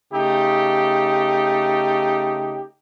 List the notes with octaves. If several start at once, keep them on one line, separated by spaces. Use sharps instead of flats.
C#3 A3 D#4 G4